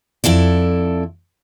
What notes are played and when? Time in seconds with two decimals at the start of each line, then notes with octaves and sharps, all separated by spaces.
0.24 F2 E4 A4 D5